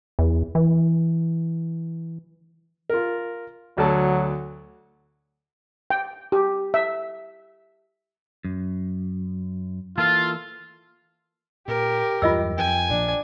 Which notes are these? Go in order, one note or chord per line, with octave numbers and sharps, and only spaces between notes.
E2
E3
F4 A#4
D2 F#3 A4 A5
G5
G4
E5
F#2
E3 A#3 F4 A4
A#2 G4 A#4
E2 G2 F#3 F4 D#5 E6
F2 G5 G#5
A#1 A#2 F3 D4